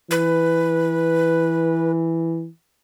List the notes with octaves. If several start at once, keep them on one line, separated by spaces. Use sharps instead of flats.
E3 B4